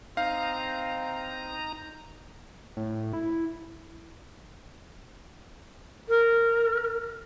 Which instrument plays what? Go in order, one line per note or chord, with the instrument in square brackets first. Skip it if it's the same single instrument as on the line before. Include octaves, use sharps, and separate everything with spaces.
[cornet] C4 [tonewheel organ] D#4 A#5 [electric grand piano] F5
[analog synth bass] A2
E4
[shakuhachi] A#4